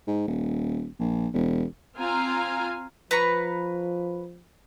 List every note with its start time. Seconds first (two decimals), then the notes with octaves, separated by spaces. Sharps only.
0.07 G#2
0.27 D#1
0.99 A#1
1.34 E1
1.96 C4 F4 F5 G#5 A#5
3.11 F3 B4 A#5 C#6